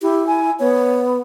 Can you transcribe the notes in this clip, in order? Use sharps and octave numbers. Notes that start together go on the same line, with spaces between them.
E4 G4
G#5
B3 C#5